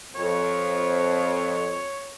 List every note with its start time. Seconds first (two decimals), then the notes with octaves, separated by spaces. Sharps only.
0.15 F2 C#5